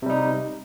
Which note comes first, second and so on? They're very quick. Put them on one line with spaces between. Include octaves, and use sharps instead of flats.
C3 G3 D#4